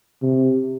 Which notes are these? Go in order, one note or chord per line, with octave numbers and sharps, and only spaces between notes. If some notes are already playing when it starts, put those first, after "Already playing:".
C3